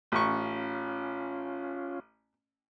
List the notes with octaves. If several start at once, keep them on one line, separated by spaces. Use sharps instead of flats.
A1 C#4 F4 C#6